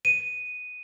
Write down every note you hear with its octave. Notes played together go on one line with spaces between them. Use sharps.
D#7